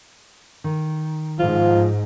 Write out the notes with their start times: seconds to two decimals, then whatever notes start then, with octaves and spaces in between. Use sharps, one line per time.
0.64 D#3
1.39 G#2 F3 F4